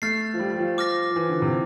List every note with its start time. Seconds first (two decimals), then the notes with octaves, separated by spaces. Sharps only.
0.02 A3 F6 A6 C7
0.34 F3
0.39 G3
0.53 G3
0.59 F3
0.78 D6 F6 A#6
1.10 F3
1.16 E3
1.29 D3
1.42 C3